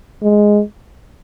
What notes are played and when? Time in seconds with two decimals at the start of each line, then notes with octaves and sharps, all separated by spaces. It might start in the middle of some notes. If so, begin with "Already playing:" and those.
0.23 G#3